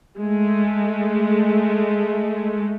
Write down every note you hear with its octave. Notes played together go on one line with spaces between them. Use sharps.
G#3 A3